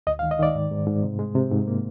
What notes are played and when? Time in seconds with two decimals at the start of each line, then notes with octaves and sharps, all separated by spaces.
0.07 D2 D#5
0.19 F5
0.23 D#3
0.31 D#5
0.39 D#3 D5
0.55 G#2
0.71 G#2
0.87 G#2
1.03 C3
1.19 G#3
1.35 C3
1.51 G#2
1.67 A#3